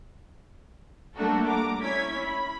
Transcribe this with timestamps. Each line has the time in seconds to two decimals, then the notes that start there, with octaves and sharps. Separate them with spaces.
1.15 G3 A3 A#3 D4 F#4 A4
1.48 A#5 D6
1.82 C#4 E4 C#5 G#6 B6
2.23 B5